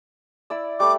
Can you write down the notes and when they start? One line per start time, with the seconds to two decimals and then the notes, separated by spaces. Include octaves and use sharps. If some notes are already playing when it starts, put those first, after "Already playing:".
0.50 E4 D5 E6
0.80 G3 A3 B5 D6